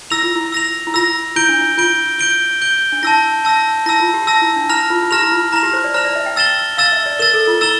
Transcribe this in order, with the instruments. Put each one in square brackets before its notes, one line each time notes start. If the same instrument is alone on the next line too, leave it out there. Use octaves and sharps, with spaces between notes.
[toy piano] E4 [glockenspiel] E6 A#6 F7
[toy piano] F4
E4
[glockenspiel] E6 A#6 F7
[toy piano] E4
[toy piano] F4 [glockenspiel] E6 A#6 F7
[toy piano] E4 [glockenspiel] G6 D7 G7
[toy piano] D4
E4
[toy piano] F4 [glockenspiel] G6 D7 G7
[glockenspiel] G6 D7 G7
G6 D7 G7
[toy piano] D4
[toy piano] E4 [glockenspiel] A5 E6 A#6
[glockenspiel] A5 E6 A#6
[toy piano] E4 [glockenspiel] A5 E6 A#6
[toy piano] F4
G4
[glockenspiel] A5 E6 A#6
[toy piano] E4
D4
[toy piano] E4 [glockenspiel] A#5 F6 A#6 F7
[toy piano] F4
F4
[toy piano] G4 [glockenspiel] A#5 F6 A#6 F7
[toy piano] E4
F4
[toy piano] E4 [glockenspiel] A#5 F6 A#6 F7
[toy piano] G4
C5
D5
[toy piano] C5 [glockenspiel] A#5 F6 A#6 F7
[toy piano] D5
E5
G5
[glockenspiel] E6 A6 E7 G7
[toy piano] F5 [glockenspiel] E6 A6 E7 G7
[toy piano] E5
D5
[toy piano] A#4 [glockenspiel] E6 A6 E7 G7
[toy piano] A4
F4
[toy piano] E4 [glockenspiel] E6 A6 E7 G7